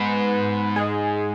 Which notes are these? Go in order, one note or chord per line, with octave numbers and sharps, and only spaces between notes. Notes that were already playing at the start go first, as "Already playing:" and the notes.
Already playing: G#2 B3 B4
G#3 G#4